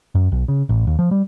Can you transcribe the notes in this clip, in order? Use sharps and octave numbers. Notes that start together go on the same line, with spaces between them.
F#2
B1
C#3
A1
D#2
F3
G3